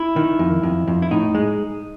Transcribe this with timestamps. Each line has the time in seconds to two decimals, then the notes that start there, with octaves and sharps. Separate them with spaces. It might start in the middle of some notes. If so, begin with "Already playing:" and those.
Already playing: E4
0.16 D#3
0.39 F2
0.63 F2
0.87 F2
1.02 E4
1.11 A2 D#4
1.35 G#3